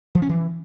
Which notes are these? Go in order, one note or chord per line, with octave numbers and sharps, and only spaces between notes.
F3
C#4
E3